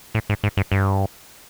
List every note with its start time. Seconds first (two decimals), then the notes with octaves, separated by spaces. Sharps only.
0.15 A2
0.30 G#2
0.44 G#2
0.57 G2
0.72 G2